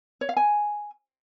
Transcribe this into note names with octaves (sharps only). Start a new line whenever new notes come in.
C#5
F5
G#5